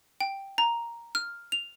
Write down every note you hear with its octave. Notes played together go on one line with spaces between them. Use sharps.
G5
A#5
F6
F7